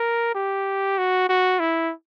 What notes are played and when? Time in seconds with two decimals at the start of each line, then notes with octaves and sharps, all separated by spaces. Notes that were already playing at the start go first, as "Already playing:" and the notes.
Already playing: A#4
0.35 G4
0.98 F#4
1.29 F#4
1.60 E4